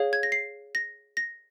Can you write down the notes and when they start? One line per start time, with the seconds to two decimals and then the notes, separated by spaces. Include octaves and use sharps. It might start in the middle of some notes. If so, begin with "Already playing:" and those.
Already playing: G#4 C#5 F5
0.13 G#6
0.23 A#6
0.32 C7
0.75 A#6
1.17 A#6